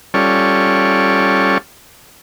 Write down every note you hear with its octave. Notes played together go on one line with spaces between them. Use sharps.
G3 C#4 F4 A4 C#5 D5